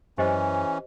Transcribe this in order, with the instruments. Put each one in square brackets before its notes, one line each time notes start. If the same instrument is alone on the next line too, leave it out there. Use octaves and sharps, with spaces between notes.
[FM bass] F#2 [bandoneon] E3 C#4 [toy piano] G4 C5 D#5